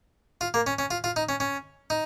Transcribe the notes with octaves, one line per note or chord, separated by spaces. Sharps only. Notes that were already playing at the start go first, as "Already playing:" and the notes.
F4
A#3
C#4
C#4
F4
F4
D#4
C#4
C#4
D#4